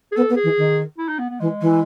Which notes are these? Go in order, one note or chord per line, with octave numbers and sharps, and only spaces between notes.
G#4
B3 A4
B3
G#4
E3
D#3
E4
D#4
B3
B3
E3 G#3
E3